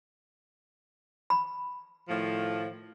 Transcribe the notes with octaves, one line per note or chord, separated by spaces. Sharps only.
B5
A2 D#3 F3